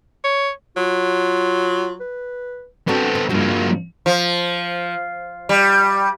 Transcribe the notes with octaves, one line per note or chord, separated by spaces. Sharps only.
C#5
F#3 F4
B4
B3 C4 D4 F#4 A4
C4
G2 F3 F#3 A#3
F3
G3